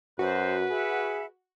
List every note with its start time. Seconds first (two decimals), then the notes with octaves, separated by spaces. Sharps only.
0.19 F#2 F#4 B4 C5
0.70 G#4 E5 F#5 B5